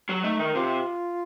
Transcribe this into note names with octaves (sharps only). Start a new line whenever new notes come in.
F#3
A3 D#4
D#3
C3 F4